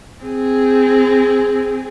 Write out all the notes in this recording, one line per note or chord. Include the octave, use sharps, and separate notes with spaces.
C4 G#4